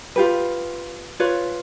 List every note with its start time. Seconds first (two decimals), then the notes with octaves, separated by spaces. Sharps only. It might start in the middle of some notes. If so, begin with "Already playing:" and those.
0.16 F4 G4 B4
1.20 F4 B4 C#5